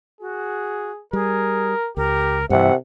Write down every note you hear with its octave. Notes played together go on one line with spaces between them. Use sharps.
F#4 G#4
G3 G#4 A#4
C#2 G4 A#4
G2 C3 E3 E5 F#5